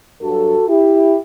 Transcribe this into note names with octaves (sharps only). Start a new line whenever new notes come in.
G2 F#3 F#4 A4
E4 G4